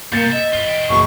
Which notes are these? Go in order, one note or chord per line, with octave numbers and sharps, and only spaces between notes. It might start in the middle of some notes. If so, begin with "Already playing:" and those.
G2 C3 A#3 G6 A6 C#7
D#5 E5
F4 B4 G7
E3 G5
F#1 B2 B5 C#6